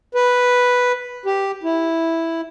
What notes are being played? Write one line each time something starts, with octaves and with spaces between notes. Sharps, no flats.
B4
G4
E4